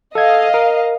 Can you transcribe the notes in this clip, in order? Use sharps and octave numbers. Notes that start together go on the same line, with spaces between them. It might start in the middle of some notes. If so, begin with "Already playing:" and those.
A4 D#5 F5 G#6
A#4